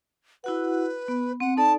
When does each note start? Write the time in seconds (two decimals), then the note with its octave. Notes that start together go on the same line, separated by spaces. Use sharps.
0.44 E4 F#4 B4 F#5
1.08 B3
1.40 C4 F#5
1.57 D#4 A4 D5 A5